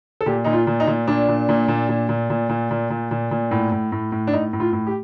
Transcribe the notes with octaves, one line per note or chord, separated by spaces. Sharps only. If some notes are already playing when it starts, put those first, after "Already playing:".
A4
A#2 G4
A#2 D#4
F4
A#2
D#4
A#2
A#2 D4
A#2
A#2
A#2
A#2
A#2
A#2
A#2
A#2
A#2
A#2
A#2
A2
A2
A2
A2
D4
A2 D#4
A2
F4
A2
G4